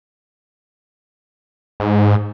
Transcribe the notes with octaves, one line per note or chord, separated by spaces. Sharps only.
G#2